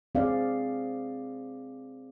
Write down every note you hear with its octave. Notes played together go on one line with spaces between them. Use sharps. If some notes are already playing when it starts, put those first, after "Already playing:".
C4 G#4 D5 F5